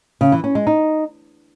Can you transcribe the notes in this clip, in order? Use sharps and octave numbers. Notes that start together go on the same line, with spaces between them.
C#3
E3
C#4
G#3
D#4